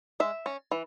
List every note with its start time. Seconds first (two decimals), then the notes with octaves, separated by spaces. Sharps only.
0.20 G#3 E5
0.46 C#4
0.71 E3